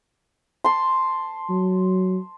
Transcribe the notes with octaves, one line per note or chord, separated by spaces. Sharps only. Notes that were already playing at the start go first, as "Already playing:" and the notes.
A5 C6
F#3